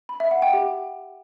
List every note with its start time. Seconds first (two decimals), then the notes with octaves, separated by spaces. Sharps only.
0.09 B5
0.20 E5
0.31 F#5
0.42 G5
0.53 G4